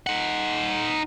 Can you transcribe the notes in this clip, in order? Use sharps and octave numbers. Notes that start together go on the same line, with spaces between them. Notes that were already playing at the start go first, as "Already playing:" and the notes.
D#4 F#5